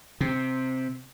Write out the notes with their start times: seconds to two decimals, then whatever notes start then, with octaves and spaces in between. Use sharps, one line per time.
0.21 C3